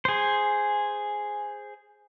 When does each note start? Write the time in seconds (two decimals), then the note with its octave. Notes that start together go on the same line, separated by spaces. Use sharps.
0.05 G#4 C5